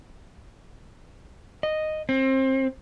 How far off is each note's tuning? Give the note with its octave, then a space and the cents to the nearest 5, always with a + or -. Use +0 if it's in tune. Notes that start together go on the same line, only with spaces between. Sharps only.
D#5 -5
C4 +25